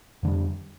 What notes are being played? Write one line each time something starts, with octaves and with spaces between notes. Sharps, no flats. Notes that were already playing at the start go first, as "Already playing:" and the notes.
F2 D3 G3